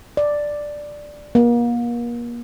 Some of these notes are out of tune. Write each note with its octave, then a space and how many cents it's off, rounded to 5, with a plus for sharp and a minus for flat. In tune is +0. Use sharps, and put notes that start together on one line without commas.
D5 +5
A#3 +35